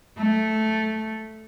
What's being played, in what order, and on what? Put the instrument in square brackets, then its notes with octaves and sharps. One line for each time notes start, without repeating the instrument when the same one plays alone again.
[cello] A3